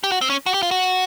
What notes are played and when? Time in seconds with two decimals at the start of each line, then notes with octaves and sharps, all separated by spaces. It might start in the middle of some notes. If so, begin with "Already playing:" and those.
0.04 G4
0.12 F#4
0.21 C4
0.30 C#4
0.46 F#4
0.54 G4
0.63 F4
0.71 F#4